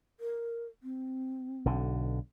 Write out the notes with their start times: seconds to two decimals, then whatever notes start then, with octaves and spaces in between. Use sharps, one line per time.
0.20 A#4
0.83 C4
1.65 B1 D3